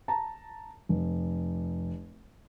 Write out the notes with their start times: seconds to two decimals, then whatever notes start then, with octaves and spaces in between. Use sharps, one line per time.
0.08 A5 A#5
0.89 F1